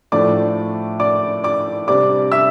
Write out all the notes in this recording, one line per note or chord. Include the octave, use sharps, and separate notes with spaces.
A2 F3 A3 D4 D5 D6
D5 D6
D5 D6
C3 G3 D4 D5 D6
E5 E6